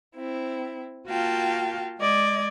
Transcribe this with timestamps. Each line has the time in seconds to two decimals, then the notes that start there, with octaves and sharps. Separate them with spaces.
0.16 C4 E4
1.07 A#3 F4 F#4 F5 G5 A5
1.99 G#3 D5 D#5 G#6